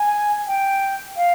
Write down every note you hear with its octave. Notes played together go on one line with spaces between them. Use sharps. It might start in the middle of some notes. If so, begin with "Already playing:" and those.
Already playing: G#5
G5
F5